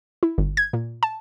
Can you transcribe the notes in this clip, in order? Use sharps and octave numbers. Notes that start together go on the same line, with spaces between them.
E4
G1
G#6
A#2
A5